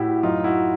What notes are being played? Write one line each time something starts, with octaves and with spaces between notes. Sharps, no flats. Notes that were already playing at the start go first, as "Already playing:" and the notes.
Already playing: A2 E4 F#4 G4
F#2 D#4 F4
E4 F#4